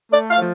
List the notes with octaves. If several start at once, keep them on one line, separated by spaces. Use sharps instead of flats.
A3 D5
F5
F3